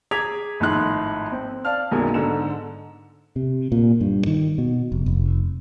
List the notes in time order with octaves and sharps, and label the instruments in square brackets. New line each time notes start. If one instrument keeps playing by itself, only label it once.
[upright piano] G#4 A#5 D6 G#6 B6 F7
G#1 A2 F3 D#4 C6 F#6
C4
D5 F5 A5 F6
B1 F#2 B2 G#3 A#3 G#5
G#2 D3 A4 E7
[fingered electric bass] C3
A#2
G2
D#3
B2
F1
F1